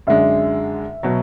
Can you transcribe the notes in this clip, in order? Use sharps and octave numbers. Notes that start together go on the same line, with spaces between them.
F#2 D3 G#3 D4 E5
B2 F#3